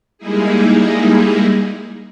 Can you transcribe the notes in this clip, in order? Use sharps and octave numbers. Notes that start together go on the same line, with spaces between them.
G3 G#3 A#3 D#4 E4 G#4